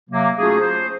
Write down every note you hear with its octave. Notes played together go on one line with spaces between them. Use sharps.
C3 F#3 A#3
A3 C#4 D#4 F4 F#4 G#4
C5